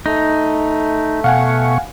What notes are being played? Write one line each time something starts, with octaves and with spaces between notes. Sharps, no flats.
A3 D#4
B2 F5 F#5 G#5 C#6